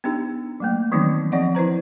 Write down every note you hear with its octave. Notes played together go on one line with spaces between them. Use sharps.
B3 D4 D#4 G4
F#3 A3 A#3
D#3 E3 F#3 B3 C4 D#4
F3 C4 D5 D#5 F#5
E4 B4 C5 A#5